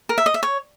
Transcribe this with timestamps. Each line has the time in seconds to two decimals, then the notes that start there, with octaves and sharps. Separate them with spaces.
0.09 A#4
0.18 E5
0.26 D#5
0.34 E5
0.43 C#5